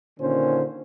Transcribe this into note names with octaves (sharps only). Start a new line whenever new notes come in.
A#2 D3 D#3 C#4 C5